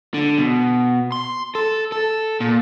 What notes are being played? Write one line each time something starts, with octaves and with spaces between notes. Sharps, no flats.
D3
B2
C6
A4
A4
A#2